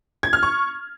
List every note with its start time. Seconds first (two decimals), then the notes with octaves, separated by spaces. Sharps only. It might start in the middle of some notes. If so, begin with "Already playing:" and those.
0.23 G#6
0.33 F6
0.43 C#6